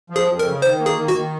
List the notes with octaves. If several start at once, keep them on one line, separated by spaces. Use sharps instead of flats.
F3
G#4
F2
A#4
C#3
D#3 C5
A#3
G#4
D#3
F#4
D#3